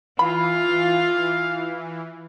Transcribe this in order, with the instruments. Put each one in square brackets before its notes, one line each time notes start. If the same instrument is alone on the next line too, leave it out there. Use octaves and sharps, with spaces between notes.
[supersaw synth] E3 [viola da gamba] F4 [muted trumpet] F5 [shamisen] B5